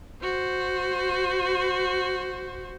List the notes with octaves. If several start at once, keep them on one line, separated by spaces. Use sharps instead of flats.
F#4 C5